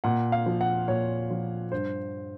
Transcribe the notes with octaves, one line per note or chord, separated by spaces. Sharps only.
A#2 F#5
F5
F3
F#5
A#2 C#5
F3
G2 C5